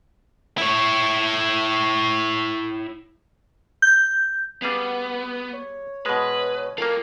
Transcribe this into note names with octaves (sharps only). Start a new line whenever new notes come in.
E4 C#5
G6
G3 B3 G#4 F5
C#5
B2 G#3 B4
A#3 F4 A4 A#4 F5